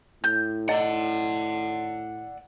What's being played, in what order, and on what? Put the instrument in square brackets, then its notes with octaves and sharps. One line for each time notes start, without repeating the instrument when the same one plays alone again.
[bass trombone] A2 [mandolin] G6
[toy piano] E4 D#5 [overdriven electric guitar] D5 F#5